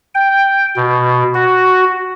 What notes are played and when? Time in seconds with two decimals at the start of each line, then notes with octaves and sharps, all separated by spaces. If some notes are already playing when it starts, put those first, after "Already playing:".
0.14 G5
0.76 B2
1.34 F#4